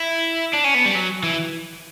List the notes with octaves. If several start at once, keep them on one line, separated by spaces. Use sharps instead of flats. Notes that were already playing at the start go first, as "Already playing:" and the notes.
Already playing: E4
D4
C#4
B3
G3
F#3
E3